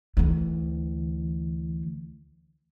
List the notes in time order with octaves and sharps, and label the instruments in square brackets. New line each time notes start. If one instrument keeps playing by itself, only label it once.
[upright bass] D2 E3